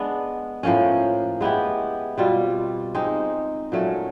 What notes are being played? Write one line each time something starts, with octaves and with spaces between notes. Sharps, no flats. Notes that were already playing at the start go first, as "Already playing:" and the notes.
Already playing: G#3 B3 D4
A2 F3 A#3 C#4
G#3 B3 E4 G4
B2 G3 C4 F4
G#3 C4 D#4
A#2 F#3 A3 C#4